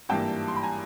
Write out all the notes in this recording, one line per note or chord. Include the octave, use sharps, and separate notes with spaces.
G#1 G2 E3 G3 A#3 G5 A5
C6
B5
G#5 A#5